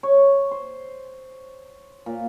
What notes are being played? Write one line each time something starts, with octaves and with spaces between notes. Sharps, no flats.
C#5
C5
A#2